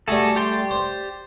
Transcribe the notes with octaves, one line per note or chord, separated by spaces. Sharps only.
G3 A3 F#4 G#4 A4
G4 D5 C6
C5